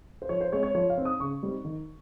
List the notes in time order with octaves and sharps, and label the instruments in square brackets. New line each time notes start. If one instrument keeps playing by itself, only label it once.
[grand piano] C5
F3 C#5
C5
G#3 C4 C#5
C#5
F3 C#5
F5
C4 D#4
D#6
C#3 C#6
G3 C4 D#4
D#3